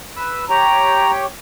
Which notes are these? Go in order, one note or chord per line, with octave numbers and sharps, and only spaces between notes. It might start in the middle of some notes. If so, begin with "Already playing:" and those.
B4 E6
G4 C#5 G5 A#5